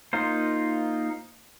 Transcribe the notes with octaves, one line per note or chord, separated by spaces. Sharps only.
A#3 D#4 F4 C5